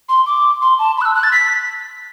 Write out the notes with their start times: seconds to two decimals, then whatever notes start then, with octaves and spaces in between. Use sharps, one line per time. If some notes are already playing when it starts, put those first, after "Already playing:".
0.09 C6
0.27 D6
0.62 C6
0.79 A5
0.98 B5
1.01 F#6
1.05 E6
1.15 F#6
1.23 A6
1.32 B6